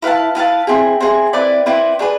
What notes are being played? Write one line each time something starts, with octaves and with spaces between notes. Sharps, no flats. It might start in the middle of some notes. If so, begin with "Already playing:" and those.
E4 B4 F5 A5
E4 B4 F5 A5
C4 E4 G#4
C4 E4 G#4
C4 E4 B4 D5
C4 E4 B4 D5
D4 G#4 B4